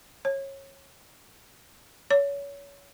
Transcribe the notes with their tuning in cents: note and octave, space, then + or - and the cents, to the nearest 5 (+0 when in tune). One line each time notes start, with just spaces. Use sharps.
C#5 -20
C#5 +25